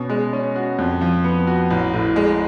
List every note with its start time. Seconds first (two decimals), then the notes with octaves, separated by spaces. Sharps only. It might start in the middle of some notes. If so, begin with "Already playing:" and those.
Already playing: B2 C#4
0.10 G#3
0.33 C#4
0.56 F#4
0.79 F2
1.01 F3
1.24 B3
1.47 F#4
1.70 A1
1.93 A2
2.16 G#3